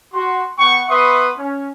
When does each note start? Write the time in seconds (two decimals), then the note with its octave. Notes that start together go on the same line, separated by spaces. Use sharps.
0.13 F#4 C6
0.59 B3 F#5 G5 C#6
0.88 B3 B4 E5 C6 C#6 D#6
1.38 C#4